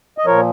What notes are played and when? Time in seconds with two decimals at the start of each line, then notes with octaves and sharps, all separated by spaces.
0.18 D#5
0.25 A#2 F3 A#4 C#5